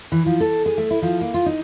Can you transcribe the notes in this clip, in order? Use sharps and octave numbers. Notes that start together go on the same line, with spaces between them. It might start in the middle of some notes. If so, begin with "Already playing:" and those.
E3
F3
A4
G#4
A3
E4
F3
A#3
F4
D#4